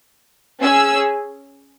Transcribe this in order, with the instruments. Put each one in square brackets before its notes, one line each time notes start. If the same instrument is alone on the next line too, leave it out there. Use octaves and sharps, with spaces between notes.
[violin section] C#4 G#4 E6